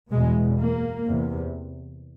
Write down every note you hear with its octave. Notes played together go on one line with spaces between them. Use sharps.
E2 B2 G#3
A#3
E2 C3